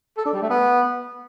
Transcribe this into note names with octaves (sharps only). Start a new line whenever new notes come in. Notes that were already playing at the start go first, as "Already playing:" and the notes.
A4
D4
G3
A3
B3